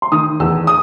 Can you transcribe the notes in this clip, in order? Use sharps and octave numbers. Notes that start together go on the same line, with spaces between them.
C6
D#3 D#6
E2 E6
D#6